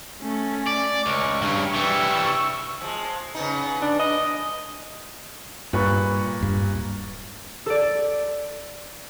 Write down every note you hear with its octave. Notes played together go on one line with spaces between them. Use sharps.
A3 C#4
D5
C#2 C#6
G2 C#3
E3 G3 C#6 E6
F3 G#3
C#3 B3 D#4
D4
D#5
G2 A#2 B4 C#6
D1 G2
A4 D5